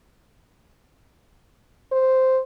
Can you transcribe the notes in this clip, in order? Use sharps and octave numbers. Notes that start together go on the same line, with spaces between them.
C5